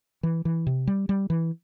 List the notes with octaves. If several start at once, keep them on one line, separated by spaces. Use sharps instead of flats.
E3
E3
C3
G3
G3
E3